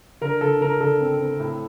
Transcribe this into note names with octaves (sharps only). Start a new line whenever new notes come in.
D3 A#4
D3 A4
D3 A#4
D3 A4
C4
C4
A2